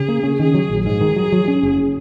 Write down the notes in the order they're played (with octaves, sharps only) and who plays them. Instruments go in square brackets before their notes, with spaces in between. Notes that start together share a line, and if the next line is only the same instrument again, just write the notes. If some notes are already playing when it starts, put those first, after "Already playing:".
Already playing: [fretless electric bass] C#3 [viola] G#4
[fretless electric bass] A#3
C#4
[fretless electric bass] D#3 [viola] G#4
[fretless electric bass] F#3
A#1
[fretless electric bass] G#2 [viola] G#4
[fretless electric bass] D#3
F#3
F#3
C#4
F#1